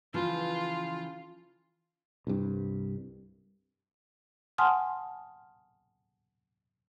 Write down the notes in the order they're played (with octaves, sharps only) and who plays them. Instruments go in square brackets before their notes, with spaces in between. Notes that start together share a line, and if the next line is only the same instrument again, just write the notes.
[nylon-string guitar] C#3 E3 F3 [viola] F4
[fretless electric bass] C2 G2
[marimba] F#5 G#5 A5 C6 D#6 F6